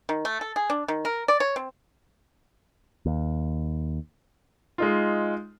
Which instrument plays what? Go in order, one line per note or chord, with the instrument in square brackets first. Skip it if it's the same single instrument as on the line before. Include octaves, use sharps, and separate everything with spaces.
[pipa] D#3
A3
A4
G#4
D4
D#3
A#4
D5
C#5
C4
[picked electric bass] D#2
[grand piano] G#3 D#4 F4